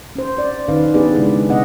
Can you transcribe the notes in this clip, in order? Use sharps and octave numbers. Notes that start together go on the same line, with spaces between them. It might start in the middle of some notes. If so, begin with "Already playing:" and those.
C#4 C5
D5
D#3 F#3 C#4 D#4 B4 F5
B3 D4 G4 G#4 B4 D5
C#3 G#3 D4 E4
B2 B3 C4 D#5 F#5